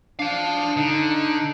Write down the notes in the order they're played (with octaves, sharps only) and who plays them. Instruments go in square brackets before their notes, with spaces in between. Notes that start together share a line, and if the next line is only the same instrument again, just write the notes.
[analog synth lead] D4 [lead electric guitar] F5 A5
[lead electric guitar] D3 [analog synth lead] D#4